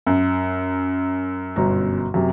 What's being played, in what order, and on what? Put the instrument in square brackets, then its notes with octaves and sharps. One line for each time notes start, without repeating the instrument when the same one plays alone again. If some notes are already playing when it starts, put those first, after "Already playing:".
[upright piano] F#2
[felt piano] G1 B2 A#5
F#2 C3